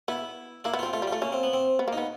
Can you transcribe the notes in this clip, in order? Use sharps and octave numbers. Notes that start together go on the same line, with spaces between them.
B3 E4
A#3 E4
B3
C4 F4
A3 F4
G3
A3 F4
A#3 C#4
C4
B3
C4
B3
A#3
B3 D#4